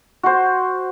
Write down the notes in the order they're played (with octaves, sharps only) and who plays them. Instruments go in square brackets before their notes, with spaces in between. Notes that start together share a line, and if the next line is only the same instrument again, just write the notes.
[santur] F#4 C5